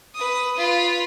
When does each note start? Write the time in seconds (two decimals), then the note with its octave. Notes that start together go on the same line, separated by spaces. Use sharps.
0.14 B4 D#6
0.57 F4 B4